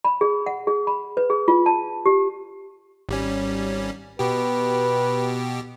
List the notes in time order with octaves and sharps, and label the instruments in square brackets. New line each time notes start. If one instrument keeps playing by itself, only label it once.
[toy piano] B5
G#4
F#5
G#4
B5
B4
G#4
F4
A5
G4
[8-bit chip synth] G#1 G3 C#4
[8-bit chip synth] B2 G4 [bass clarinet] B4